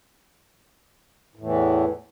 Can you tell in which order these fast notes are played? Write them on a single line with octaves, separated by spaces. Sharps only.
A2 E2 E3